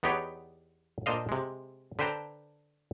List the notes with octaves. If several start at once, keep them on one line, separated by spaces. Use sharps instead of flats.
E2 B3 D#4 G4 B4 C#5
A#2 D4 C5 D#5 F5
C3 G#3
D3 B4 C5 G5 A5 A#5